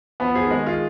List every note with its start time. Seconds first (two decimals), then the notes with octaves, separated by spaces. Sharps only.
0.20 F3 B3
0.35 F3 G#4
0.44 D#3
0.51 G#3
0.66 F4